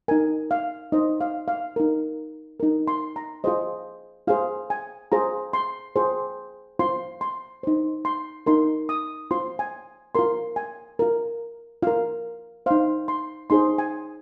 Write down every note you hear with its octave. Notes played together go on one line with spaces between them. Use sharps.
D#4 A#4 G#5
F5
D#4 C5 D#5
F5
F5
D#4 A#4
D#4 A#4
C6
A#5
F4 G#4 C5 D#5
F4 G#4 C5 F5
G#5
F4 G#4 C5 A#5
C6
F4 G#4 C5
F4 C5 C6
C6
D#4 C5
C6
D#4 A#4 C6
D#6
F4 C5 C6
G#5
F4 A#4 C6
G#5
F4 A#4
F4 A#4 F5
D#4 C5 F5
C6
D#4 G#4 C5 C6
G#5